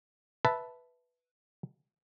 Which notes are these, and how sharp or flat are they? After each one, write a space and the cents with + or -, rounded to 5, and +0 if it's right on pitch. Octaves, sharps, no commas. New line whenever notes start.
B4 +0 E5 +0 A5 +0